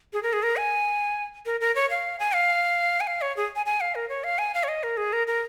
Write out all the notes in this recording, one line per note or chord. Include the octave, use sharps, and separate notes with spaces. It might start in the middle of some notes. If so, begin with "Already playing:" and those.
G#4
A#4
G#4
A#4
G#5
A#4
A#4
C#5
F5
G#5
F5
G#5
F5
C#5
G#4
G#5
G#5
F5
A#4
C#5
F5
G#5
F5
C#5
D#5
A#4
G#4
A#4
A#4